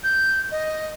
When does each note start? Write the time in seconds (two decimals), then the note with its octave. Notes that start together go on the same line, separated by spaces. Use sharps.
0.04 G6
0.51 D#5